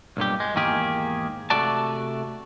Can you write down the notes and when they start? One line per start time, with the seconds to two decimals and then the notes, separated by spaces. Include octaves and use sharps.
0.17 B1 G2 A#2 G4
0.40 G#3
0.55 E2 G#2 D#3 A#3 G4 G#4
1.50 C3 A3 F#4 D5 A5